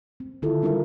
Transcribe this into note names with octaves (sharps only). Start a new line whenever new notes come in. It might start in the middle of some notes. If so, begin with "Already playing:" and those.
C4
D3 D#3 E4 F4 A4
G3 D4 E4 F4 A#4 E5